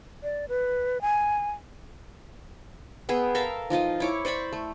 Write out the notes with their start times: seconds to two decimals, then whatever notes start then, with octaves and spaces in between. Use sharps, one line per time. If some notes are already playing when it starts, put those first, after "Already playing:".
0.23 D5
0.49 B4
1.01 G#5
3.09 B3 G#4 E5 G5
3.35 A4 A#4 E5 F5
3.70 F3 D#4 F4 D#5
4.00 E4 C#5 D6
4.25 C5 D5 B5 C#6
4.53 A3